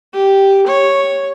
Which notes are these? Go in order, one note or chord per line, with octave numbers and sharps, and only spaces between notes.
G4
C#5